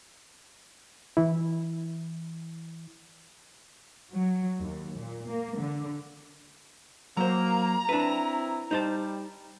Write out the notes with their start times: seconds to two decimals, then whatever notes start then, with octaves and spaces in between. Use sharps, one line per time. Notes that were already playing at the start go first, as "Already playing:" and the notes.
1.17 E3 E4
4.13 F#3
4.60 D#2
4.98 A#2
5.29 A#3
5.59 D3
7.17 F#3 A#3 C5 A#5
7.89 C4 D4 E4 B4
8.71 G3 D#4 C5 A5